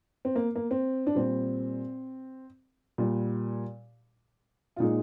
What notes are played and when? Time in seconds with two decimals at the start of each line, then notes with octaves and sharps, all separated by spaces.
0.25 C4
0.36 A#3
0.55 A#3
0.71 C4
1.07 D4
1.15 A#2 G3 C4
2.98 A#2 G3
4.76 F4
4.80 A#2 G#3 D#4